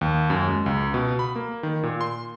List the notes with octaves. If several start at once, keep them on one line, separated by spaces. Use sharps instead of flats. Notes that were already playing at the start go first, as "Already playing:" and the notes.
D#2
F#2
G#3
C#2
B2
B5
A#3
D#3
A#2
C6